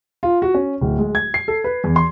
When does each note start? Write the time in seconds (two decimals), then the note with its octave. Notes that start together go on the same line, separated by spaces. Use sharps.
0.23 F4
0.42 F#4
0.54 C#4
0.81 D1
0.99 G#3
1.15 G#6
1.34 C7
1.48 A4
1.64 B4
1.84 E2
1.96 C6